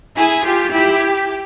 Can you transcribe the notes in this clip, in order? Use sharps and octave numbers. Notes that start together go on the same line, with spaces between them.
E4 G#4
F4 G4
E4 G4